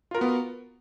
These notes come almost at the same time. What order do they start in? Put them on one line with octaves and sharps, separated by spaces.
F4 A#4 F#4 B3